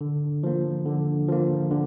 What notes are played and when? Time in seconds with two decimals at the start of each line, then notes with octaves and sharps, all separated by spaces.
0.01 D3
0.43 F3 A#3
0.86 D3
1.28 F3 A#3
1.71 D3